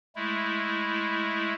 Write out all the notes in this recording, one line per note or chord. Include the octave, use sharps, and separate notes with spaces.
G#3 A3 E4